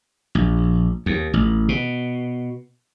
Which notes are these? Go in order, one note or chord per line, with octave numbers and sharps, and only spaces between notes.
A#1
D#2
A1
B2